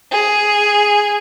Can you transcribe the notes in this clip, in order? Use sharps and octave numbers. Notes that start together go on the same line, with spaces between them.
G#4